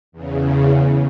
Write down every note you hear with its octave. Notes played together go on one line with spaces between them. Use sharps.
E2 C#3